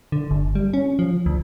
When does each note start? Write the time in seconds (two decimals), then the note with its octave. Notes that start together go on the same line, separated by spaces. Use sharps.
0.12 D3
0.31 G1
0.55 G3
0.74 C#4
0.99 F3
1.26 D2